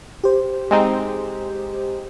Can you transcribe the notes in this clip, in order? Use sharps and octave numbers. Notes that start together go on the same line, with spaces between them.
G4 C5
G#3 C4 D#4